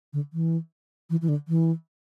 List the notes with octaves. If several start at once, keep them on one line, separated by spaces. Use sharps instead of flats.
D3
E3
E3
E3
D3
E3